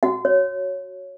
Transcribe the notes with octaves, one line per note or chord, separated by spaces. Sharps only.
F#4 F#5
C#5